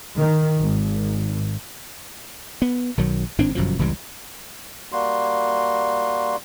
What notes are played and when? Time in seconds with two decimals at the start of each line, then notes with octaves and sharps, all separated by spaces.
0.17 D#3
0.59 G#1
2.62 B3
2.97 B1 D#3 F#3
3.38 G#1 A2 C4 D4
3.55 G1 F#2 B2 F3
3.79 F1 C#2 E3 G3
4.92 G3 A#3 F#4 C6